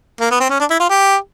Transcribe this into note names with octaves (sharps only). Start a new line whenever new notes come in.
A#3
B3
C4
C#4
D4
E4
F4
G4